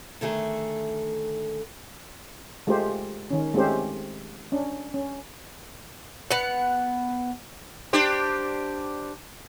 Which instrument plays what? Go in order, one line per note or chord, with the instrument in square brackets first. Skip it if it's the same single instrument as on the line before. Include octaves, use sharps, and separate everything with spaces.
[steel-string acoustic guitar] D3 D#3 A3 G#4
[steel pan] G#3 A3 F4 G4 C5
D#3 C#4
G#3 A3 C4 C#4 G4 C5
C#4 D4
C#4
[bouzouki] B3 F#5
[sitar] D4 G4 C5